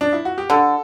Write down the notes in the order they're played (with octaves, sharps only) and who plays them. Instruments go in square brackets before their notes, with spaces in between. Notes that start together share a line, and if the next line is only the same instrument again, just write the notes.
[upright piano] D4
E4
F#4
G4
[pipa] D3 [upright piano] A4